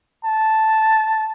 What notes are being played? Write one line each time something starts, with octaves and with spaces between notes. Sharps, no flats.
A5